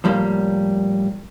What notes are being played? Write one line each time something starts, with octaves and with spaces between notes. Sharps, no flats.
A2 F3 G3 A#3